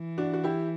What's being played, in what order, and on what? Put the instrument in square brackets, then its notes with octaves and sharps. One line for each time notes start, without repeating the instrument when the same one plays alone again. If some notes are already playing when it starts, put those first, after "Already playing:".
Already playing: [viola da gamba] E3
[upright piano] D4 F#4
F#4
E4 G4